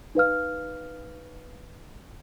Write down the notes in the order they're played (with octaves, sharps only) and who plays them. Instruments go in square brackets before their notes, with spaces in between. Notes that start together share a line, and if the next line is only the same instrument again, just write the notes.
[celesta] D#4 B4 F5 F6